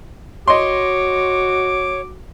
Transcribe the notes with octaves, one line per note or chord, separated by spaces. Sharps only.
F#4 C#5 D#5 C6 D6